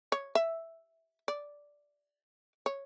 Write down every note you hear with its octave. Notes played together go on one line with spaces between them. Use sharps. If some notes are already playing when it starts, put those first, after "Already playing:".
C#5
E5
D5
C#5